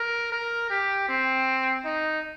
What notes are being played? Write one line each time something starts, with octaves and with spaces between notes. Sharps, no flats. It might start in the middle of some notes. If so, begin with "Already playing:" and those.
Already playing: A#4
A#4
G4
C4
D#4